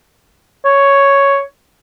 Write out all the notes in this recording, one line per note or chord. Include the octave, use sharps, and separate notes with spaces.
C#5